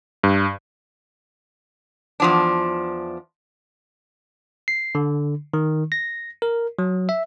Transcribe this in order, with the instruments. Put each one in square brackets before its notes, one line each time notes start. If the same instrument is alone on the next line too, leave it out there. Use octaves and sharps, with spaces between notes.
[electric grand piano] G2
[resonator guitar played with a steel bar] E2 F3 D4
[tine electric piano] C7
D3
D#3
A#6
A#4
F#3
E5